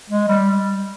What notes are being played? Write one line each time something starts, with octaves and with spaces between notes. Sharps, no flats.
G#3
G3